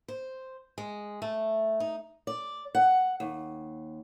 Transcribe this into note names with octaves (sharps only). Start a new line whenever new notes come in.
C5
G#3
A3
D#4
D5
F#5
D#2